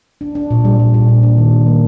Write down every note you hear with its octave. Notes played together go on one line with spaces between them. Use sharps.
D4
D4
A#2
G3
A#2
A#2
D4
D4
D#3
D#3
A#3